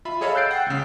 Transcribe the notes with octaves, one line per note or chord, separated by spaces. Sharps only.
F4 E5 B5
G#4 A4 C#5 D#5 F5 B5
E6 F#6 G6 A6 C7 D7
F#5 G5
C#2 C#3